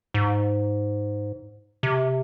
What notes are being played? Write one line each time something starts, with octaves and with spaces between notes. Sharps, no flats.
G#2
C3